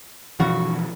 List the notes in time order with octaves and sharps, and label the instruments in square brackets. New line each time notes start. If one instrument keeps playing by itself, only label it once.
[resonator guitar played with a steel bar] G2 F#4 [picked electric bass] B2 E3 F3